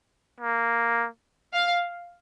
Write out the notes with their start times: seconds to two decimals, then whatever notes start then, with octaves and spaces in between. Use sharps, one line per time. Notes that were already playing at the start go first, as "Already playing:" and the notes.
0.40 A#3
1.53 F5